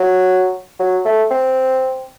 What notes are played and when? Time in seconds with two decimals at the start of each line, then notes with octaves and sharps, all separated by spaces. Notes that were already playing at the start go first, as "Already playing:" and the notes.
Already playing: F#3
0.79 F#3
1.05 A3
1.31 C4